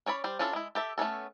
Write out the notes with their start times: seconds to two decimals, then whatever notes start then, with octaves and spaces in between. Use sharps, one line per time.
0.06 C#4 C#5 D5 B5
0.24 G3 C5
0.39 C#4 D4 E4 F4 A4
0.53 G#3 E4
0.75 G4 A4 E5
0.98 A3 B3 C#4 A4